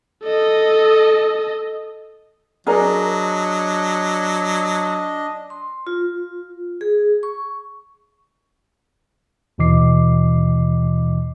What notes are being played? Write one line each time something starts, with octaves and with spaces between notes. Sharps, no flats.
A4 D#5
F#3 D4 G#4 A#4 D5 D#5
C6
F4
G#4
C#6
D#2 B2 E3 D#5 D6 C7